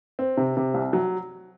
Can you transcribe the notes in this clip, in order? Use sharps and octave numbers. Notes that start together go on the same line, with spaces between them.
C4
C3
C3
C2
F#3